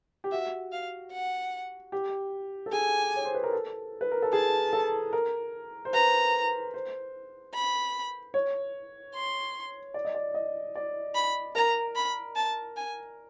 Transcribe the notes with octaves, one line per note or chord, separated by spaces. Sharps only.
G4
F#4 E5
F5
F#5
G4
A4
G#4 G#5
C#5
C5
B4
A#4
A4
B4
A#4
A4
G#4 A5
A4
A#4
C5
B4 A#5
C5
B5
C#5
C6
D5
D#5
D5
D#5
D5
B5
A#4 A#5
B5
A5
G#5